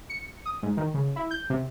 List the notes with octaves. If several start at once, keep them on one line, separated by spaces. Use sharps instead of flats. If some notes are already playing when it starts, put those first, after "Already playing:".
C#7
D#6
G#2
D#3
C#3
E4
G6
C3